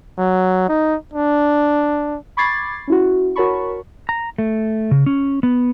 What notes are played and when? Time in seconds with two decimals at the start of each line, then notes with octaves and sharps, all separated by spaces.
0.18 F#3
0.69 D#4
1.14 D4
2.37 B5 C#6 D6 G#6 A6 C7
2.87 C#4 E4 F#4
3.36 F#4 A#4 C#5 A5 B5 C#6
4.09 A#5
4.38 A3
4.91 C#3
5.06 C#4
5.43 B3